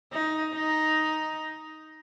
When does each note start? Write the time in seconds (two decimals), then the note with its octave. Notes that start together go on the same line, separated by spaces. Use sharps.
0.12 D#4
0.54 D#4